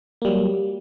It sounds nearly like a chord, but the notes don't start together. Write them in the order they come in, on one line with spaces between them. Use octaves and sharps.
A#3 G3 F#3